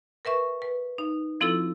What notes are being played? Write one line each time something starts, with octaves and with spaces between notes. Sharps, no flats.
A#4 B4 E5 C#6
B4
D#4
F3 C4 E4 F4 A4 E6